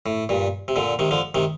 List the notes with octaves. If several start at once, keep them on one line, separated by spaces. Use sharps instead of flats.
A2
G2 A#2
C3
A#2 D3
C3 D#3
D3 F3
C3 D#3